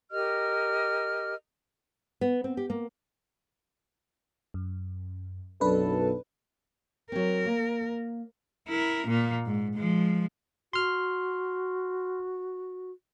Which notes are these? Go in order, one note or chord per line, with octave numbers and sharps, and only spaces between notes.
G4 A#4 D#5 F6
B3
C4
G4
A#3
F#2
B1 F#2 D4 A4 B4
F#3 C4 A#4
A#3
E4 A#4
A#2 A#3
G#2
F3 G#3
F#4 C6 F6